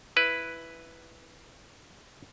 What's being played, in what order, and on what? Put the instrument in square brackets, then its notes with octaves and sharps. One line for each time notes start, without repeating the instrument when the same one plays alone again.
[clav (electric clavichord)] E4 B4